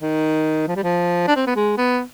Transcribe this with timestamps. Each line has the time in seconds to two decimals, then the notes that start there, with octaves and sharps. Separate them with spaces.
0.01 D#3
0.68 F3
0.76 G3
0.84 F3
1.28 D4
1.36 C4
1.47 B3
1.56 G#3
1.78 B3